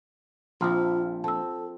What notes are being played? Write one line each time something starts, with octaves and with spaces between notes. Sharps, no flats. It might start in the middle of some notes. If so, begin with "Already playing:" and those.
A#1 F3 C4 F4 E5 C6 F6
C4 A4 A5 E6